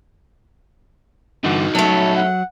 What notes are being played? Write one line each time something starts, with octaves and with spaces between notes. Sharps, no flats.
G2 D3 E3 D#4 F#4
F#3 A3 C#4 A5
F#5